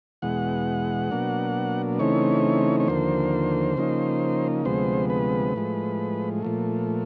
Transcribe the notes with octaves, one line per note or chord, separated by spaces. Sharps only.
E2 B2 G#3 F#5
B2 F#3 A#3 D4
C#3 E3 A3 C4 D#4 C#5
C#5
D#2 D3 F3 A#3 C5
C#3 F3 A#3 D#4
D2 C3 F3 G#3 B3 C5
B4
A2 F3 G#3
A#2 F3 A3